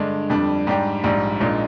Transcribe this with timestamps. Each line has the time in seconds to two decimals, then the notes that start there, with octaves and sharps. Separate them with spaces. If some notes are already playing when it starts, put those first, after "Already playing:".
Already playing: G2 D3 G#3 D4
0.30 F2 D3 G3 D4
0.67 G#2 G3 D4 G4
1.04 A#1 G#2 G3
1.40 A#1 A#2 G#3 D#4